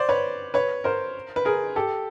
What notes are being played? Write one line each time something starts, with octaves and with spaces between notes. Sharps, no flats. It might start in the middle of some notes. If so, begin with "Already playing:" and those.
Already playing: C5 D5
B4 C#5
B4 C#5
A#4 C5
B4
G#4 A#4
G4 A4